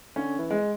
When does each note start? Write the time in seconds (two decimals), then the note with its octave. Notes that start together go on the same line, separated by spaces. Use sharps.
0.16 D3 C#4
0.39 E3
0.51 G#3